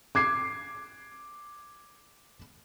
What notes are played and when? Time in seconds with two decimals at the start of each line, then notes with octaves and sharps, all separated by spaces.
0.15 D6 G#6 C7